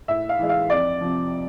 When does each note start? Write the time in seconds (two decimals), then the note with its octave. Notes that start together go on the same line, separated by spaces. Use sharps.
0.08 A2 E5
0.29 F5
0.39 E3 G#3
0.49 F5
0.70 F2 D5
1.01 C3 F3